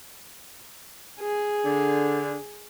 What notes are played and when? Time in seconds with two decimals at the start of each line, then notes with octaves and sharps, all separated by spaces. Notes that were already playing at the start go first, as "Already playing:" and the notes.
1.20 G#4
1.64 D3